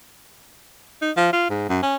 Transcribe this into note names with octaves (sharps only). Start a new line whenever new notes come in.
D#4
F3
F4
G#2
F#2
C#4